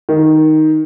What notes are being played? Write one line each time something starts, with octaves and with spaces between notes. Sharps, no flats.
D#3